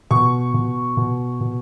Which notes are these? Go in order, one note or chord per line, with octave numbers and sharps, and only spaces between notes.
B2 C#6
B2
B2
B2